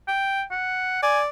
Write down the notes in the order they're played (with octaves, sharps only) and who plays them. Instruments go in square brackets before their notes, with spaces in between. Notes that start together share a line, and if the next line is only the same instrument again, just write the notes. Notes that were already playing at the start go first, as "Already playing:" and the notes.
[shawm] G5
F#5
[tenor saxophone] D5 [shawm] G#5